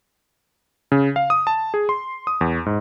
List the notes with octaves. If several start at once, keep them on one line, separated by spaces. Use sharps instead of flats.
C#3
F5
D#6
A5
G#4
C6
D#6
E2
G#2